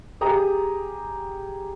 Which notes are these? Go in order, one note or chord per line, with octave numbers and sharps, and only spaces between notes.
G4 G#4 A#5 D#6